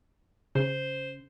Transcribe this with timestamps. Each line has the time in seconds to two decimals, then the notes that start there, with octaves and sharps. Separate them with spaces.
0.55 C#3 C5